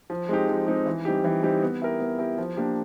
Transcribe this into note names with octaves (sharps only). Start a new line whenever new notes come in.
F3
G#3 C4 D#4 G4
F3
G#3 C4 D#4 G4
E3
G3 C4 D#4 G4
E3
G3 C4 D#4 G4
B3
E4 G4 A#4
B3
E4 G4 A#4
F3
A#3 D4 G4